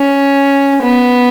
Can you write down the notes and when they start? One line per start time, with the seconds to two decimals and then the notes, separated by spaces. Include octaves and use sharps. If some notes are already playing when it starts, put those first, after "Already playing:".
Already playing: C#4
0.82 B3